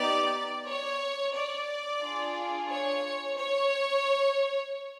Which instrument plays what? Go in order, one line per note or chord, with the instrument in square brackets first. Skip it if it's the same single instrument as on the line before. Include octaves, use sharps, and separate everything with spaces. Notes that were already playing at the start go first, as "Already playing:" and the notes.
Already playing: [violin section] B3 D#4 G4 D5
C#5
D5
D4 F4 G#4
C#5
C#5